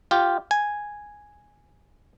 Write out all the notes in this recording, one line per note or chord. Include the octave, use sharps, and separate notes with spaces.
F4 G4
G#5